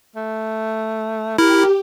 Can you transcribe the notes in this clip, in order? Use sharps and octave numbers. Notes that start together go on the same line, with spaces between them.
A3
E4 G4 A#4